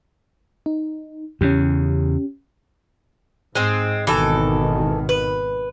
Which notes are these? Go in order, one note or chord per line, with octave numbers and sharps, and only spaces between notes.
D#4
E2 C#3 C#4 G4
G#2 G#3 C4
G#1 B2 D#3 E3 A4
B4